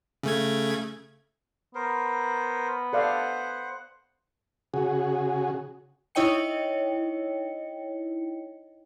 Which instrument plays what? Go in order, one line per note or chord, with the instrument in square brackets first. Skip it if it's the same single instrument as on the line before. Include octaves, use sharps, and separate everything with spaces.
[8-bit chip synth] C#3 A3 G#6
[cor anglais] B3 [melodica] A#4 C5
[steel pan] A4 D5 F5 [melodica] C5 F#5
[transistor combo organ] C#3 F#4 G#4
[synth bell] D#4 E4 C#5 D#5 G5 C#7